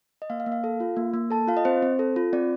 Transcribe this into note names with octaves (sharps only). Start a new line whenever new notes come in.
D#5
A#3 F5
F5
A#3
F5
A4
F4
A#3
A#3
A4 A5
F4 F5
D#5
C4 C5
C4
A4
F4
C4 D5